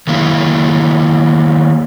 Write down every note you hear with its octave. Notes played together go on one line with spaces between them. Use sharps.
D#3 F#3 A#3 E4 G#4